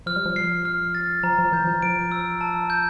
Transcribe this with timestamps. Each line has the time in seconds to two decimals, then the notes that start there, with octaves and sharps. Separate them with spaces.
0.06 F3 F6
0.16 G3
0.26 F3
0.36 C7
0.65 F6
0.95 A6
1.23 F3 A#5
1.39 F3
1.53 E3 G6
1.67 F3
1.82 F3 D7
2.12 E6
2.41 A5
2.70 G6